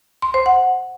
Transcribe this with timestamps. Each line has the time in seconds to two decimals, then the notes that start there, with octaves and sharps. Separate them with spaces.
0.22 C6
0.34 C5
0.46 F#5